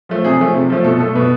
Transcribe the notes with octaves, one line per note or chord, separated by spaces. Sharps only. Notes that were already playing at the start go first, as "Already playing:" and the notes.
F3 A3
C3 G#4
F3 A3
C3
F3 A3
B2 A4
A3 A4
B2 B4